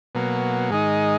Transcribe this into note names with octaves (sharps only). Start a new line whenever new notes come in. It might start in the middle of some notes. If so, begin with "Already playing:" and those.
B2 F#3 A#3
G#2 D#3 G#3 D#4